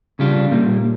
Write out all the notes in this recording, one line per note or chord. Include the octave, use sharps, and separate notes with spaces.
C#3 G3 D4 F4
A#2 G3 A#3